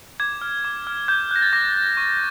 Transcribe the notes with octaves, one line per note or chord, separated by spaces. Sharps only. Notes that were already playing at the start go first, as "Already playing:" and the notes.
D6 G#6
F6
D6
F6
D6 G6
F#6 A#6
A6
D6 A#6
F#6
C#6